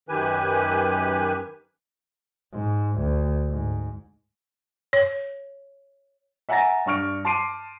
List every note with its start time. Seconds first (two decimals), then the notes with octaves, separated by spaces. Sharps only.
0.09 F#2 D#3 G4 B4 G#5
2.52 G#2
2.99 D2
3.49 G#2
4.93 C#5
6.49 E5 F#5 G#5 A#5 A6 A#6
6.86 G2 D4 C#6 F6 D7
7.25 A5 C6 D6 C7 D7 D#7